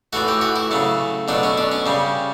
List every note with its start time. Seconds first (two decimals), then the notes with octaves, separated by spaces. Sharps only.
0.13 A2 E3 A3 F#4
0.28 G4
0.41 F#4
0.56 E4
0.71 C#3 F#3 A3
1.28 B2 F#3 A3 D4
1.43 C#4
1.58 D4
1.72 C#4
1.86 C#3 G3